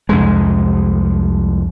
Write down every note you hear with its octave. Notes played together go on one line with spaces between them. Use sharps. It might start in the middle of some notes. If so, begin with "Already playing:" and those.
C2 F2 G#3